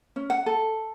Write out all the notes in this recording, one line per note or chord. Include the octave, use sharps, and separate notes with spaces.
C#4
F#5
A4